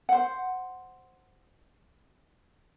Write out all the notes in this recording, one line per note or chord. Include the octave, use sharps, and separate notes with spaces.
C5 F#5